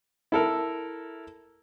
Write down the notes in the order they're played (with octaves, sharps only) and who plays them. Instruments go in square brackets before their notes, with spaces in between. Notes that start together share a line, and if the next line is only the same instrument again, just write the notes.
[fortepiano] E4 A4 A#4